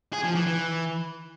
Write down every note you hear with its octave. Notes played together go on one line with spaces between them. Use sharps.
G#4
F3
E3
E3